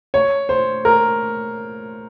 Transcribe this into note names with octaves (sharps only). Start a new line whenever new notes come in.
C#5
C5
A#4